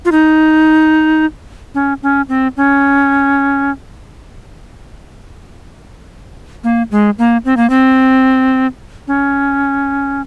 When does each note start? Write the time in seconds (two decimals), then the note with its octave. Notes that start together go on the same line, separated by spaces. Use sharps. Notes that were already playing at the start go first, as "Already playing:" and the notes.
0.05 F4
0.12 D#4
1.75 C#4
2.03 C#4
2.29 C4
2.57 C#4
6.64 A#3
6.91 G#3
7.18 A#3
7.45 C4
7.57 A#3
7.70 C4
9.08 C#4